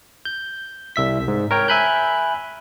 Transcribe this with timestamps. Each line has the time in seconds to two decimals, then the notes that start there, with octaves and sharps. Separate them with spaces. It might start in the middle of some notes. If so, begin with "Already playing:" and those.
0.25 G6
0.96 C2 E5 B6
1.28 G#2
1.51 A#4 C#5 G5
1.68 E5 G#5 B5 F#6 G6